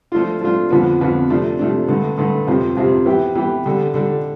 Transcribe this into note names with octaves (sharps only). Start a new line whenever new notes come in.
F3 A3 D4 F4
F3 A3 D4 F4
F2 D3 F3 B3
F2 D3 F3 B3
C3 F3 A3 D4
C3 F3 A3 D4
G2 D3 A3
G2 D3 A3
F2 C3 G3 C4
F2 C3 G3 C4
E3 B3 E4 G4
E3 B3 E4 G4
D3 G3 D4 A4
D3 G3 D4 A4